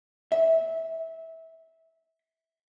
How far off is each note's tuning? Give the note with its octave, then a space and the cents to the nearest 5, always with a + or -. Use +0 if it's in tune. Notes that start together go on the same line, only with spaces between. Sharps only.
E5 -20